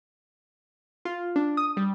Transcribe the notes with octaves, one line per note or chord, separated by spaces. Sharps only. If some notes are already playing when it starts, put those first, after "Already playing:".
F4
D4
D#6
G3